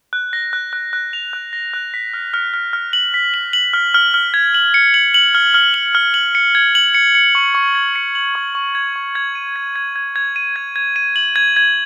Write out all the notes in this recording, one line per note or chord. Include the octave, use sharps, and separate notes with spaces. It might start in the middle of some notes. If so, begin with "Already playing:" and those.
F#6
A#6
F#6
F#6
F#6
F7
F#6
A#6
F#6
B6
F6
F6
F6
F6
F#7
B6
F#7
F#7
F6
F6
F6
G#6
F#7
C#7
F#7
F#7
F6
F6
F#7
F6
F#7
C#7
G#6
F#7
C#7
C#7
C#6
C#6
G#6
C#7
F#7
C#6
C#6
G#6
C#6
G#6
D#7
G#6
G#6
G#6
G#6
D#7
G#6
G#6
D#7
F#7
G#6
G#6